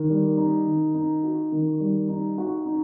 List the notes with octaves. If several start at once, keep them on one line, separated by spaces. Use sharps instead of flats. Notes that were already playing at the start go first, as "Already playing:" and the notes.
Already playing: D#3
G3
D#4
D#3
D#4
F#4
D#3
G3
D#4
F#4
D#4